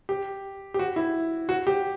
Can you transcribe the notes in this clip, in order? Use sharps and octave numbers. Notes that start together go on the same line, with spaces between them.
G4
G4
F#4
E4
F#4
G4